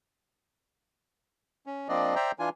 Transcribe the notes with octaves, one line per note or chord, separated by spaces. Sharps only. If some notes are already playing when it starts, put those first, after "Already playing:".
C#4
F3 A#3 C4 D4 D5 D#5
C5 D5 E5 G5 A#5
E3 D4 F4 G#5